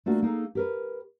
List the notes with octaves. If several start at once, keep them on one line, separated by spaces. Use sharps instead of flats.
A3 A#3 D4 F4 F#4
A#3 D#4 G#4 A4
G4 A#4 B4